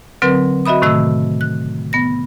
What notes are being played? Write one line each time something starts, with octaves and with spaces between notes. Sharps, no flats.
D3 F#3 C4 A#4 B4
F#4 D#5 E5 B5 D#6
A2 C3 D#3 A3 D#5 E6
F#6
B3 A#6